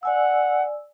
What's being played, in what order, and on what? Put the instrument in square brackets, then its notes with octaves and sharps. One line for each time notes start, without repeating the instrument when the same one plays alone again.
[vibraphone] D5 G#5 E6 [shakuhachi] F#5